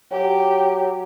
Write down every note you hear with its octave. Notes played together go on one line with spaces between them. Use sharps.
F#3 G4